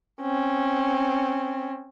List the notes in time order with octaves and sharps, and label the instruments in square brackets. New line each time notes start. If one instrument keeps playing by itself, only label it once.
[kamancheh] C4 C#4